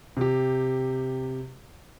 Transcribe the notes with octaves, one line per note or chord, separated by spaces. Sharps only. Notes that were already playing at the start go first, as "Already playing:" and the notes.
C3 G4